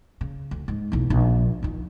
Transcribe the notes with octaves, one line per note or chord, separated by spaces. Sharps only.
C#3
D2
G#2
B1 E2
A#1
F2 D#3